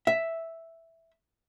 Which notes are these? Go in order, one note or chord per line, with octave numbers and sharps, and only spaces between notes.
E5